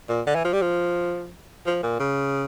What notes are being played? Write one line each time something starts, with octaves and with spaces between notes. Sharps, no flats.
A#2
D3
E3
F3
G3
F3
F3
A#2
C#3